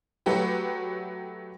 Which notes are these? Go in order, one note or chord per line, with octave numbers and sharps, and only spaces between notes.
F#3 A3 F#4 G4 B4